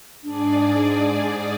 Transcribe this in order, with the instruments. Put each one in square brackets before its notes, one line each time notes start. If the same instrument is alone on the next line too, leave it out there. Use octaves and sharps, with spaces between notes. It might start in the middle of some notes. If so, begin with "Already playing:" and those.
[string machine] G#2 G#4 D5 [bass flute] D4